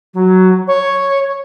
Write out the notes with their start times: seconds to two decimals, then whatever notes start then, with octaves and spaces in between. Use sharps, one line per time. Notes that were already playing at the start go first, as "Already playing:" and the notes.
0.14 F#3
0.68 C#5